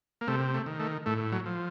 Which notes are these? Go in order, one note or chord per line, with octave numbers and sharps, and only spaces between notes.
A#3
C3 A3
A3
D#3
A3
A2 A3
F#3
F3